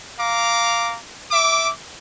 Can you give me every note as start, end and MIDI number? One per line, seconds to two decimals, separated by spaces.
0.18 0.97 77
0.18 0.97 82
0.18 0.97 86
1.31 1.72 76
1.31 1.72 86